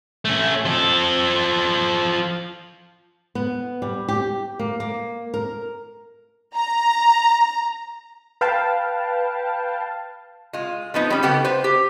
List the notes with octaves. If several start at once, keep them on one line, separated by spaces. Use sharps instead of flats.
A3 C#4
F3 A4
B3
G3
G4
A#3
A#3
A#4
A#5
B4 F5 G5 A5
G#3 F4
F3 B3 D#4
G3 C#4
C#3 B3 G4 A4
B4 C5
G4